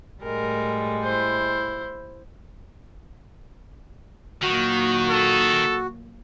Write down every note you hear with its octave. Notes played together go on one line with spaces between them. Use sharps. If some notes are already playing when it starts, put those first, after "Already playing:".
A2 G3 G#3 A#4
E4 C5
A#2 D#3 F#3 A#3 F#4
A4